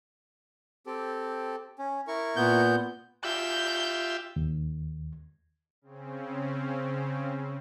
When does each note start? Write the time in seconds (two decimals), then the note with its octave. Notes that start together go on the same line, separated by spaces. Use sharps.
0.86 C4 G4 A4
1.79 C#4
2.07 E4 A#4 C#6
2.36 A#2 B3 G6
3.24 F4 G4 E5 G6
4.36 D#2
5.82 C#3 C4 C#4